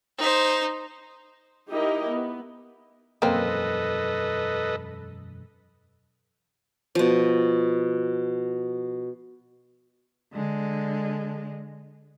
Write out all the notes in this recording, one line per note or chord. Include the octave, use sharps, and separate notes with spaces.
D#4 C5
D#4 E4 G4 A#4 D#5
B3
E1 F#2 A#3 C4 A4 B4 D#5
B2 F3
D3 G#3